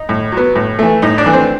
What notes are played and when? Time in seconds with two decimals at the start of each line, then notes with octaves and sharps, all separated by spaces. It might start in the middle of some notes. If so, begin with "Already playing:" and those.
Already playing: D#4
0.09 A2
0.32 F#3
0.37 B3
0.55 A2
0.79 E3 A3
1.02 A2 D#4 D#5
1.18 D4 D5
1.26 E3 A3
1.33 C4 C5